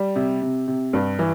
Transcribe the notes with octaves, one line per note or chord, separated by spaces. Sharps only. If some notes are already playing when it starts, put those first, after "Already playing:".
Already playing: G3
C3
C3
C3
G2
E3